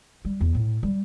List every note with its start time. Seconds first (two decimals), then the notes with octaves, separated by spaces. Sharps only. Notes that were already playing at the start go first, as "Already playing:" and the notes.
0.25 G3
0.41 E2
0.55 A2
0.83 G3